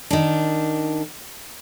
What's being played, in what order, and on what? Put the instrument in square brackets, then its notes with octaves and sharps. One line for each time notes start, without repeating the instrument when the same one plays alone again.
[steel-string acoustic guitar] D#3 D4